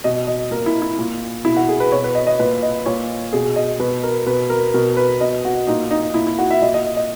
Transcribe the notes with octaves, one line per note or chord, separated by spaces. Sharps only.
B2 D#5
D#5
A#2 A#4
E4
E4
A#2
B2 E4
F#4
G#4
B4
B2 C#5
B4
D#5
D#5
A#2 B4
D#5
A#2 C#5
B2 G#4
D#5
B2 B4
A#4
B2 B4
A#4
B2 A#4
B4
B2 D#5
F#4
A#2 D#4
D#4
A#2 E4
E4
F#4
E5
A#2 D#5
D#5
D#5